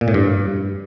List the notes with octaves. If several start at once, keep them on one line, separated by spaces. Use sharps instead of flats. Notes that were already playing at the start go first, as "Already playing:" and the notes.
A#2
A2
G2